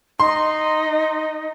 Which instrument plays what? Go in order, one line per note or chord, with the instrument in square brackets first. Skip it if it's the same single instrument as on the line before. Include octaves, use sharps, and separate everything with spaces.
[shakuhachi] D#4 [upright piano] C6